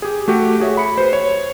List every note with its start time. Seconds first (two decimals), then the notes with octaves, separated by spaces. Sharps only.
0.02 G4 G#4
0.28 A3 F#4 G4
0.60 F#4 G#4 C#5 E5
0.77 B5 C#7
0.98 B4 C5
1.13 C#5